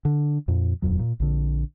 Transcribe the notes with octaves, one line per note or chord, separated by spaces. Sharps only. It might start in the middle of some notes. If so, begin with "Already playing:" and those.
D3
F2 A#2
D#1 G#1 F2 F#3
A#2
A#1 D3